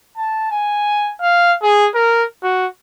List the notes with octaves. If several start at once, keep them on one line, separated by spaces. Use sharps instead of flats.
A5
G#5
F5
G#4
A#4
F#4